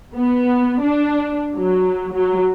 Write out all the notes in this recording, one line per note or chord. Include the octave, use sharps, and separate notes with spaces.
B3
D4
F#3
F#3